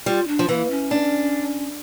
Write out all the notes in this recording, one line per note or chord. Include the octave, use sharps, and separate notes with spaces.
G3 F4
D4
F3
E3 A#3
C#4
D4